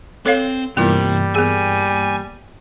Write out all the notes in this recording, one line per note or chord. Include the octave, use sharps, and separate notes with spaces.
C4 A4 C#5 F5
G2 C3 E3 G3 A#3 B3 F4
B3 G#4 G#5